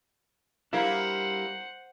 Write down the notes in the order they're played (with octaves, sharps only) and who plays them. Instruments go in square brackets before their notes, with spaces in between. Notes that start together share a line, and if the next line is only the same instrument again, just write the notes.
[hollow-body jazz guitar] G3 D4 [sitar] A#3 E4 [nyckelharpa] C5 F#5